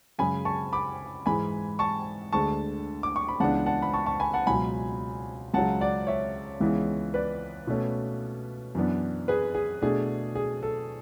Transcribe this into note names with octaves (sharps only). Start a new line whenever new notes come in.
F#2 C#3 G#3 G#5 B5
A5 C#6
B5 D6
G#2 E3 G#3 G#5 B5
A5 C#6
D2 D3 G#3 A5 C#6
D6
C#6
B5
C#2 C#3 E3 B3 D4 F#5 A5
F#5 A5
B5
A5 C#6
A5 C#6
G#5 B5
F#5 A5
C#2 B2 F#3 G#5 B5
C#2 C#3 F#3 F#5 A5
D5 F#5
C#5 E5
C#2 C#3 E3 G#3 B3
B4 D5
B2 A3 C#4
F#2 E3 B3 D4
G#4 B4
G#4
B2 A3 D4 G#4
G#4
A4